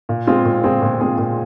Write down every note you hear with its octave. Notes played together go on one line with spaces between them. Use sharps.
A#2
G#3 C4 F4 G#4
A#2
G#3 C4 F4 G#4
A#2
G#3 C4 F4 G#4
A#2